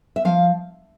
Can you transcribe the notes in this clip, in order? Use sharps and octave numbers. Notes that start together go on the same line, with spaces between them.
E5
F3 F5